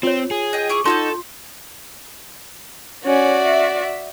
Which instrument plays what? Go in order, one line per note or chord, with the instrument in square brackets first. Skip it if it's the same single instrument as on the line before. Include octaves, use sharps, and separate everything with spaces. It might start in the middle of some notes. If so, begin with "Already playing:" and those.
[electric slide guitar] C4 [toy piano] F4 C#5
[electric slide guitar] G#4
[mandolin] D#5 G5
E4 C#6 D6
[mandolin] D#4 F#4 C#5 [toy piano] F4 C6 [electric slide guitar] A4
[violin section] C#4 [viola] F#4 D5
[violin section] E5